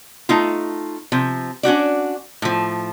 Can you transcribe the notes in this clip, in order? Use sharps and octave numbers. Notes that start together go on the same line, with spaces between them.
A3 D#4 F4
C3 F3
C#4 D4 F#4 D5
A2 F3